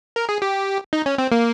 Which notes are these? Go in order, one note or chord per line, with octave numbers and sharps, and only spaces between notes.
A#4
G#4
G4
D#4
C#4
C4
A#3